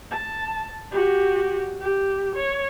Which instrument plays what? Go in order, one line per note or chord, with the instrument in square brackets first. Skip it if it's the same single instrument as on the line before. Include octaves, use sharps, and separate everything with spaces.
[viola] A5
F#4 G4
G4
C#5